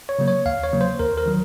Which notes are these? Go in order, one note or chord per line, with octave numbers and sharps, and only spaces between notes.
C#5
C#3 F#3 A#3
C#5
D#2 F5
C#5
C#3 F#3 A#3
C5
D#2 A#4
A#4
D#3 F#3